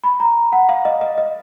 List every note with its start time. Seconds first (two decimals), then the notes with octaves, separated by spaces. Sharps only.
0.04 B5
0.20 A#5
0.52 F#5
0.69 F5
0.85 D#5
1.01 D#5
1.18 D#5